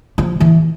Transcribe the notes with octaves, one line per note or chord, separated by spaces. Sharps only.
F3
E3